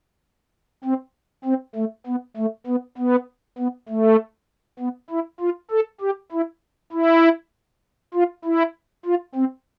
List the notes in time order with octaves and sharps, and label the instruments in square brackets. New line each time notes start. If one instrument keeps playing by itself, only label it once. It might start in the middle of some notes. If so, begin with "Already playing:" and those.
[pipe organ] C4
C4
A3
B3
A3
B3
B3
B3
A3
B3
E4
F4
A4
G4
E4
E4
F4
E4
F4
C4